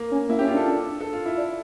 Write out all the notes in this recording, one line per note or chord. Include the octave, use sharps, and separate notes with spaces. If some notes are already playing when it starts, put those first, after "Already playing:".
Already playing: A#3
C#4
A#3 E4
C#4 G4
F4
D4 A4
A4
F4
E4
D4